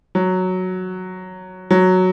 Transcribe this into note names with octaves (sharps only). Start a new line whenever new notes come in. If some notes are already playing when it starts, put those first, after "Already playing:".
F#3
F#3